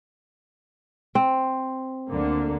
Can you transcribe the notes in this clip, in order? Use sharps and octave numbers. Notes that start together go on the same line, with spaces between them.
C4
D2 D3 A#3